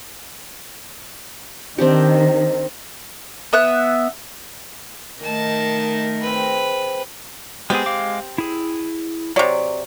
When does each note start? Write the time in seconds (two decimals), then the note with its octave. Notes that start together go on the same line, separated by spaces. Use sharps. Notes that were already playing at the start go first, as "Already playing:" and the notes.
1.78 D#3 C4 D4 G4
3.53 B3 E5 F#6
5.23 D#3 A3 D#4 A#4 A5
6.22 C4 G#4 B4
7.70 G#3 B3 C4 G4 G#4
7.86 G#3 F5 D6
8.38 E4 G#4
9.36 C3 F#3 D5